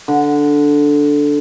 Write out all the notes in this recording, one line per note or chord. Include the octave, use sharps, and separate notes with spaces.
D3